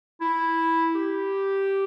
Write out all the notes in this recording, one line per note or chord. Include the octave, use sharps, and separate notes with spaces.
E4
G4